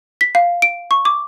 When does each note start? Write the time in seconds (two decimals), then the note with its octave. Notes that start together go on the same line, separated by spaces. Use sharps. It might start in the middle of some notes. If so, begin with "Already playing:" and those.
0.21 B6
0.35 F5
0.62 D7
0.91 C#6
1.05 D6